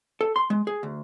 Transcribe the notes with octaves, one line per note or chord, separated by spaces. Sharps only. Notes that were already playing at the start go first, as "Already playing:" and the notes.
A4
C6
G#3
G#4
D2